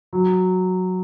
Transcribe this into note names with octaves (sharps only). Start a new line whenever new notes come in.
F#3